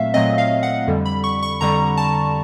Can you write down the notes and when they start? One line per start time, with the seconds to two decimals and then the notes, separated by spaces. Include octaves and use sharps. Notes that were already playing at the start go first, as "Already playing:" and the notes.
Already playing: A#2 F#3 A3 C4 E5 F5
0.14 A#2 F#3 A3 C4 D#5
0.38 F5
0.63 F#5
0.87 F2 D3 G3
1.06 B5
1.24 C#6
1.43 C#6
1.61 F2 D3 G3 A#5
1.97 A5